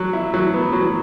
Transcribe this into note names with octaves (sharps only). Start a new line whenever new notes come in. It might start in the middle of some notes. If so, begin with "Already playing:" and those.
Already playing: F#3
E4
F#3
B3
F#3